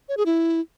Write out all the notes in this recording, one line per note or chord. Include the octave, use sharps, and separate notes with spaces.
C#5
G#4
E4